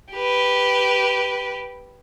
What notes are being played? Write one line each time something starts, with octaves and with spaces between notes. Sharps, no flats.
G4 B4